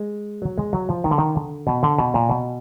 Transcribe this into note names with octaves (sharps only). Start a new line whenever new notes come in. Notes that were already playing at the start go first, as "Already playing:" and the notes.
Already playing: G#3
F#3
G#3
F#3
F3
D#3
D3
D#3
D3
B2
D3
B2
A#2
B2